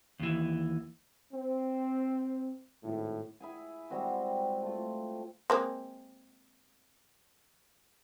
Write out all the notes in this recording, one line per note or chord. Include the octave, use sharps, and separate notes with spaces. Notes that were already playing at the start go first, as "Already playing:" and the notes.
D#2 E3
C4
G#1 A2
E4 G#4 G#5
G3 G#3 C4 F#4
A3 F4
G#3 A#3 C4